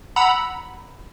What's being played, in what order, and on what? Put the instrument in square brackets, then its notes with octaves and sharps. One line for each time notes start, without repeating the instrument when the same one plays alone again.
[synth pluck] F#5 A#5 B5 E6